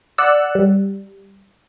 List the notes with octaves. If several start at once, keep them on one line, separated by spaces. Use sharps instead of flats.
D5 F#5 E6 F#6
G3